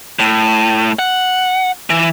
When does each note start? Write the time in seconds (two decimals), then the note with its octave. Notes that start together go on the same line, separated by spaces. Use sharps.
0.19 A2
0.99 F#5
1.90 E3